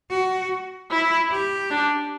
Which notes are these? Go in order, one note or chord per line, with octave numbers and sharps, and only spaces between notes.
F#4
E4
G4
D4